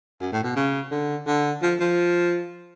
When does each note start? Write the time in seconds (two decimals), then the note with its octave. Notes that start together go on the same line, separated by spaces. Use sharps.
0.20 F#2
0.32 A2
0.43 B2
0.56 C#3
0.91 D3
1.27 D3
1.62 F3
1.80 F3